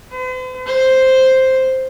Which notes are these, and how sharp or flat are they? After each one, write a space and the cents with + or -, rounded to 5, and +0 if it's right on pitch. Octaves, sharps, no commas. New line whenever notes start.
C5 -45
C5 +0